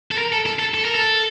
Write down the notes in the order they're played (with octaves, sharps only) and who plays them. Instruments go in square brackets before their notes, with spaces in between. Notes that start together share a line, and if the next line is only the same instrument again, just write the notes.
[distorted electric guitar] A4
A#4
A4
A4
A4
A4
A#4
A4